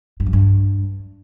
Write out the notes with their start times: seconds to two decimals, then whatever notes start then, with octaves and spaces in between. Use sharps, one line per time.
0.20 G2
0.26 F2
0.33 G2